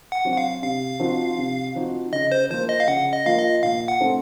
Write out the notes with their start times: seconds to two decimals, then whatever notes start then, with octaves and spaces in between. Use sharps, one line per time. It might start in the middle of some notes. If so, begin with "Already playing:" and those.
0.12 F#5
0.25 F#3 C4 F#4
0.32 F#5
0.37 F5
0.62 C3 F5
1.00 F3 C4 D#4 F#4
1.38 C3
1.75 F3 C4 D#4 F#4
2.12 C#3 D#5
2.32 C5
2.50 F3 A#3 F4 C5
2.69 D#5
2.80 F5
2.87 C#3 F#5
3.13 D#5
3.25 F3 A#3 F4 F5
3.38 D#5
3.63 A#2 F5
3.88 F#5
4.00 A3 C4 D#4